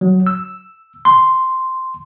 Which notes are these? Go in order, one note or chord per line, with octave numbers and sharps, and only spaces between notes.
F#3
E6
C6